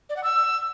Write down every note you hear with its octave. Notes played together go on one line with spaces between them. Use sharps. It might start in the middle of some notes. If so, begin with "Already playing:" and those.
D5
F#5
E6